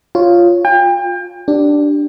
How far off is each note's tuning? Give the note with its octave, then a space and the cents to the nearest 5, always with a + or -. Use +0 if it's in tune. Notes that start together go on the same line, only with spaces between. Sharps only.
F4 +0 C#5 +0
F4 +25 G5 +35
D4 +0 G4 -10